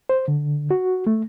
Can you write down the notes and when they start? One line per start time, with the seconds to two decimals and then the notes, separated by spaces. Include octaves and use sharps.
0.09 C5
0.28 D3
0.71 F#4
1.07 A3